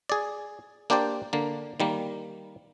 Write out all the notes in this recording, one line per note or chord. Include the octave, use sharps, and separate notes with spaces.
G#4 D5
A#3 D4 G4 C5 D5 G5
D3 A#3
D#3 G3 A#3